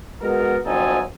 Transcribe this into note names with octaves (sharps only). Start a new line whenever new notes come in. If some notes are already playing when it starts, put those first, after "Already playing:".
G#3 B3 F#4 A#4
G1 F2 F#3 D#4 A4 G#5